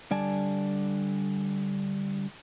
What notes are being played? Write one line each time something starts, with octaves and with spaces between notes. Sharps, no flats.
D3 G3 D5 G#5 A5